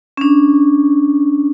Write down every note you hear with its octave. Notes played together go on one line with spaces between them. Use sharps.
C#4 D4